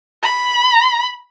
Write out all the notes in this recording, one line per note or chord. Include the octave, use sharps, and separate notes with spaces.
B5